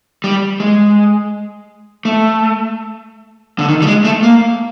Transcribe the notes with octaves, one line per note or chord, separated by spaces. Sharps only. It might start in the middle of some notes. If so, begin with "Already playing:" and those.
G3
G#3
A3
D3
D#3
G3
G#3
A3
A#3